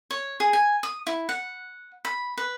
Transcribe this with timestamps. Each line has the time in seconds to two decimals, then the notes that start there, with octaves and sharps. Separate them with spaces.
0.11 C#5
0.40 G#4
0.53 G#5
0.83 D#6
1.07 E4
1.29 F#5
2.05 B5
2.37 B4